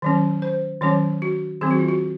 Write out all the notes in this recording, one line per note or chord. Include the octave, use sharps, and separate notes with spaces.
D#3 F#3 C#4
C5
D#3 F#3 C#4 C#5
F#4
D#3 F#3 C4 G#4
F#4
F4
F#4